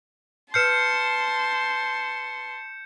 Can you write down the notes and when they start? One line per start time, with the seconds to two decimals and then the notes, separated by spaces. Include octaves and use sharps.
0.54 B4 A5 C6 F6 G6 C7 C#7 E7